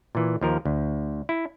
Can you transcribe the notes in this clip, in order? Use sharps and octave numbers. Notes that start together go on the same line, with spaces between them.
A#2 E3
D#2 F3 A#4
D2
E4